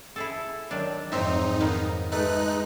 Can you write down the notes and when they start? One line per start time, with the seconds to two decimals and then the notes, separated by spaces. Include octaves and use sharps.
0.16 E4 G#4 A4
0.71 D#3 F#3 D4
1.12 F2 G#2 C4 D#4 E5
1.61 D#3 A#3 B3
2.12 G#3 A3 D#4 B4 F#6